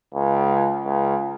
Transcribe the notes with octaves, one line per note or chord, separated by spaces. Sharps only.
C#2
C#2